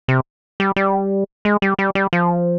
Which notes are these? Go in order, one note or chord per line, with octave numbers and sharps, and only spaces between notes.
C3
G3
G3
G#3
G3
G3
G3
F3